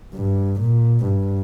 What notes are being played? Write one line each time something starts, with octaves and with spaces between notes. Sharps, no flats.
G2
A#2
G2